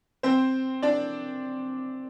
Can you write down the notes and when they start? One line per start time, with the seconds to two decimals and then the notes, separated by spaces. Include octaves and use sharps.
0.23 C4 C5
0.82 D4 D5